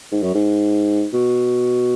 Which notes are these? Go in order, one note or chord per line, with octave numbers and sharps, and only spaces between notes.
G#2
F#2
G#2
B2